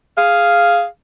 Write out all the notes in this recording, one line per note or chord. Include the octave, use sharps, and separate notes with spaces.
G#4 F5